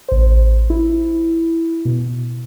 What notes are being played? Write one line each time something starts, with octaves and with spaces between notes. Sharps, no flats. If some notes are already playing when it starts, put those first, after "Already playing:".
A1 C5
E4
B2